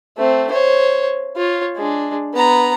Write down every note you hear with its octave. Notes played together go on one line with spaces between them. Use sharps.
A3 C4
C5 C#5
F4 C#5
G#3 D4
B3 A#5